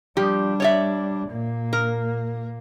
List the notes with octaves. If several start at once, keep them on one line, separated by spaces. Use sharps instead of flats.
F3 G3 D4 G4
C#5 D5 E5
A#2 A#3
A#4